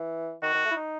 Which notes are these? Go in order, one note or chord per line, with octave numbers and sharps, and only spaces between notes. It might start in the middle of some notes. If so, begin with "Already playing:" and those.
Already playing: E3
D#3 F#4
D#3
A3
E4
D#4